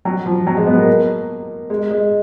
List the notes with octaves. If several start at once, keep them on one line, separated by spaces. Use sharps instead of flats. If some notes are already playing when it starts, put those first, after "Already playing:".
F#3
F3
F#3
G#3
B3
A#3
G#3
G#3